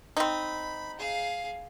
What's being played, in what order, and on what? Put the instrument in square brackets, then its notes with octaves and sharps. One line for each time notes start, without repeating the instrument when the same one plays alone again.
[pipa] C4 D#4 [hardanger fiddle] B5
[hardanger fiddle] G#4 F5